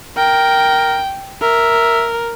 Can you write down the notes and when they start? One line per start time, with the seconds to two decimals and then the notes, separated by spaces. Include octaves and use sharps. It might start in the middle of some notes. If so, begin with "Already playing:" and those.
0.17 A#4 G5
1.42 A#4 E5